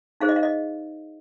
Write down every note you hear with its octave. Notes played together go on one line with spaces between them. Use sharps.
D#4 G#4 C5 F5
D#5
F5
D#5